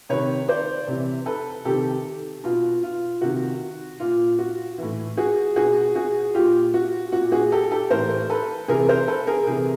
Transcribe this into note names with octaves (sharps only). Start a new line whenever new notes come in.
C3 D#3 B4 C#5
C5 D5
C3 E3
A4 B4
C3 D#3 G4 A4
B2 F4
F4
C3 D#3 F#4
A#2 F4
F#4
A2 E3
F#4 G#4
B2 F#4 G#4
F#4 G#4
A#2 F4 G4
F#4
A#2 F#4
F#4 G#4
G4 A4
G4 A4
A2 E3 A#4 C5
A4 B4
C3 E3 G#4 A#4
A#4 C5
A4 B4
G#4 A#4
C3 E3 G#4 A#4